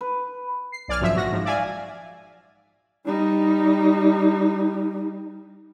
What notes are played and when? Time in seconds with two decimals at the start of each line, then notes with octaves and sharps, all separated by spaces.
0.01 B4
0.72 C7
0.88 B1 D5 G#5 F6
1.00 G#1 F#2 F3 F#3 E5
1.15 A#1 F#4 A#6
1.31 G#2 F3
1.45 D5 E5 F5 G#5
3.06 G3 D#4